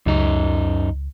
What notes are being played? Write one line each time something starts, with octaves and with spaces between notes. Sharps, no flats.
C#2 F#2 D#4